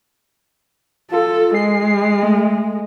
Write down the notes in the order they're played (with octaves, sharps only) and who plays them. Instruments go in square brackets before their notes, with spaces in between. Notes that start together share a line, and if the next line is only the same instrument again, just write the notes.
[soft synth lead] F4 [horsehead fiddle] A4
[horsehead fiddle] G#3 [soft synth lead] C7
[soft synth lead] A3